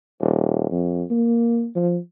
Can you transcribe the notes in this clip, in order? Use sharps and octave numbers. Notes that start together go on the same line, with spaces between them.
D#1
F2
A#3
F3